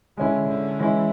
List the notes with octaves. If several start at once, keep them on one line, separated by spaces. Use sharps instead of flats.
D3 G#3 C#4 E4
D3
E3 G#3 C#4 E4